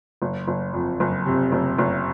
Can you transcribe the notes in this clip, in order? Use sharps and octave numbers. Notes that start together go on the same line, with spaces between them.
F#1
F#1
F2
F#1
C3
F#1
F#1